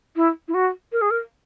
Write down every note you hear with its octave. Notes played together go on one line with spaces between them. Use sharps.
E4
E4
F#4
A#4
G#4
A#4